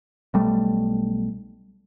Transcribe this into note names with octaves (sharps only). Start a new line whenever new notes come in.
B1 G3 A3